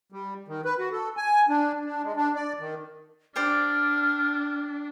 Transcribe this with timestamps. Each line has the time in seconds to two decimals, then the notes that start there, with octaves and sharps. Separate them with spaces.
0.12 G3
0.48 D#3
0.65 B4
0.79 F#4
0.92 A4
1.17 G#5
1.49 D4
1.85 D4
2.04 G#3
2.16 D4
2.35 D5
2.60 D#3
3.36 D4 G4 C5 D5 F6